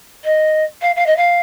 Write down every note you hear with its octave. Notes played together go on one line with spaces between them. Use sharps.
D#5
F5
F5
D#5
F5